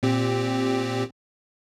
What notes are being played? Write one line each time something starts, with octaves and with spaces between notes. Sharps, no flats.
A#2 C4 G4